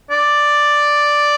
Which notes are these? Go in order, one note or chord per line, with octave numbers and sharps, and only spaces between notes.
D5